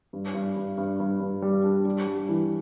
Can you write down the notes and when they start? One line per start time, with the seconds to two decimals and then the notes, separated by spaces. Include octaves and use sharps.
0.13 G2
0.34 G2
0.56 G2
0.78 G2
1.00 G2
1.20 G2
1.42 G3
1.64 D4
1.85 G3
2.07 G3
2.29 E3